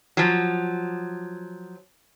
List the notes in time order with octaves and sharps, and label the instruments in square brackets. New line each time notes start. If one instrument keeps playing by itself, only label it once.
[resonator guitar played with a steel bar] F3 F#3